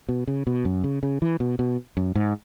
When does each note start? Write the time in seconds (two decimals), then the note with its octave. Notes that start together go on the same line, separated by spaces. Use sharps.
0.09 B2
0.27 C#3
0.47 B2
0.65 F#2
0.84 C#3
1.03 C#3
1.22 E3
1.40 B2
1.59 B2
1.97 F#2
2.15 G#2